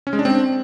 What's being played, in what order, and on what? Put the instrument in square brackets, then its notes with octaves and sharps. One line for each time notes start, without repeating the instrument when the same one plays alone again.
[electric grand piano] C#4
G#3
D4
C4